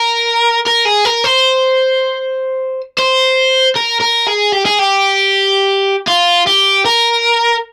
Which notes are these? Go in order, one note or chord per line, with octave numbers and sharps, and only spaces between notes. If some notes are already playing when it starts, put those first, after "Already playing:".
Already playing: A#4
A#4
G#4
A#4
C5
C5
A#4
A#4
G#4
G4
G#4
G4
F4
G4
A#4